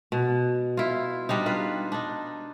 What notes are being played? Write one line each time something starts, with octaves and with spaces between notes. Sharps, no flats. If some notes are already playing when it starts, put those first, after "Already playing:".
B2
E4 F4
G3 D4 D#4
F4 B4
D4 D#4